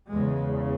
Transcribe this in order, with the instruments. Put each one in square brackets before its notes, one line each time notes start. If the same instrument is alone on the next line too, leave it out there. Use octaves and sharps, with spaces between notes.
[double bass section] E2 C#3 G#3